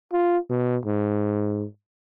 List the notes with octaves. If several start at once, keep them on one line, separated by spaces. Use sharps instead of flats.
F4
B2
G#2